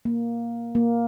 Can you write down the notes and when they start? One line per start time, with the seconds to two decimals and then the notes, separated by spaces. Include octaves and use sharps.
0.05 A#3
0.75 A#3